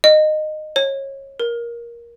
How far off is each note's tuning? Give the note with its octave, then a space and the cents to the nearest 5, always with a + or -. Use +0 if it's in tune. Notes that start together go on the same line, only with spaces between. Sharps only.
D#5 -15
C#5 -25
A#4 +15